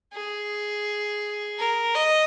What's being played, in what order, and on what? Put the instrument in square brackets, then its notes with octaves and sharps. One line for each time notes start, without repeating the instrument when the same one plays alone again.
[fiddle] G#4
A#4
D#5